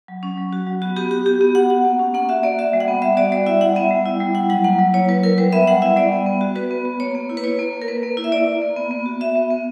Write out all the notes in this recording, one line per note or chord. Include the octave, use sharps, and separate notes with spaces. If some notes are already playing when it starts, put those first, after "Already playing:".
F#3
C#4
F#3
F#4
F#3
B3 F#4
B3 G4
F#4 G4
F#4 G4
B3 G4
B3 F#5
F#4 F#5
A#3
C#4
A#3 F#5
F#4 E5
A#3 D5
F#4 E5
G3
F#5
B3
G3 E5
F#4 D5
G3 D5
E4 E5
G3 F#5
B3 E5
G3
E4
G3
E4 F#5
F#3 F#5
A#3 F#5
F#3
E4 C#5
F#3 B4
E4 A#4
G3 B4
B3 E5
G3 F#5
E4 E5
G3 D5
B3
B3
F#4
F#4 B4
B3
B3
A#3 C#5
A#3
E4
B4
E4 C#5
A#3
A#3
A#4
A#3 B4
A#3
E4
E5
E4 D5
A#3
A#3
B3
B3
F#4
F#4 E5
B3
B3